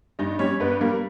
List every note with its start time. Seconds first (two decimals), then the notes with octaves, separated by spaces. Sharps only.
0.19 G2 D#4 D#5
0.39 G3 C#4 C#5
0.60 G2 B3 B4
0.81 G3 A#3 A#4